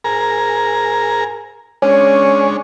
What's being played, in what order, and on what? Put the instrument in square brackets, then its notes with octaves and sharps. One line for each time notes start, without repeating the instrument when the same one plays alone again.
[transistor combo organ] G#4 A#4 A#5
[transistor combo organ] G#3 D4 C#5 [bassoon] C#4